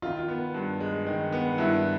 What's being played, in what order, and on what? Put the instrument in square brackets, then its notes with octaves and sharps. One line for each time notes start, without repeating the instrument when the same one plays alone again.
[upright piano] D#3 [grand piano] F4
[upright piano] B3
G2
G#3
D#3
B3
[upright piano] G2 [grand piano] E4